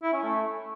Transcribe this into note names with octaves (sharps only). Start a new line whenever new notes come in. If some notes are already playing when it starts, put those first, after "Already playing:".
E4
C#4
A3